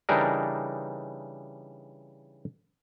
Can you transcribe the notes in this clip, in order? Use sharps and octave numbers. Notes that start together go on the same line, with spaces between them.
C#3 E3 G3 D4 D#4 A#4